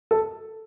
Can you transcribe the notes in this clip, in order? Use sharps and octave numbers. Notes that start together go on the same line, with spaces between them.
A4